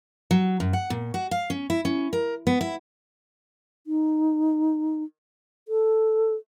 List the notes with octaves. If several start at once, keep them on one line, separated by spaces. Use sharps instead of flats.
F#3
F#2
F#5
A#2
F#4
F5
C#4
E4
C#4
A#4
B3
E4
D#4
A4